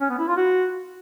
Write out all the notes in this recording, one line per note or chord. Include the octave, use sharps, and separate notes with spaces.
C#4
B3
E4
F4
F#4